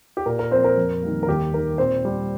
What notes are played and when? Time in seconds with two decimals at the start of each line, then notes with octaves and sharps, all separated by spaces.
0.17 G4
0.26 A#2 A#4
0.39 A#4
0.51 F3 A#3 C4 C5
0.64 A#4
0.77 F2
1.02 D#3 G3 A#3
1.23 A#4
1.28 D#2 G4
1.53 D#3 A#3 A#4
1.78 A#2 C4 C5
2.05 G3 C4